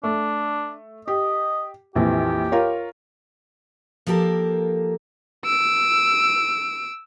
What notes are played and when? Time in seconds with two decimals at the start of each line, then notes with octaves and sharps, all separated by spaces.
0.04 A3 D4
1.08 G4 D#5
1.96 A#1 F2 E3 G4
2.52 F4 A#4 C#5
4.07 F3 A#3 G4 A4 A#4
5.45 E6 D7